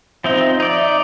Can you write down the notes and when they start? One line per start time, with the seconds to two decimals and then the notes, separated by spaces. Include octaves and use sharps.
0.24 F3 C4 D#4 E5
0.60 D#4 D5 E5